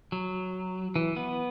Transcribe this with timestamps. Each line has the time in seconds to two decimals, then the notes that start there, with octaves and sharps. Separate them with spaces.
0.12 F#3
0.96 E3
1.16 B3